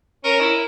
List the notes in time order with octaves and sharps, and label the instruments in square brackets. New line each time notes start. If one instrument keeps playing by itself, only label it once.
[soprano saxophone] C#4 [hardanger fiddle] A#4
[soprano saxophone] E4